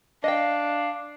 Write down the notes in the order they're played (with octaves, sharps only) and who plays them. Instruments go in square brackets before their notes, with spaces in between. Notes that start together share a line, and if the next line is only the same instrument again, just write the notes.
[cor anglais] D4 [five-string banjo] D#5 G5 [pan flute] F5